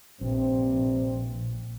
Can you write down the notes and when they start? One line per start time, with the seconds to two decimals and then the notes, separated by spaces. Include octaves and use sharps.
0.21 A#1 G2 C3 C4